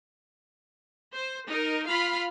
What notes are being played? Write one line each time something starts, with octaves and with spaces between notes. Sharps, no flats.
C5
D#4 A#4
F4 F5 B5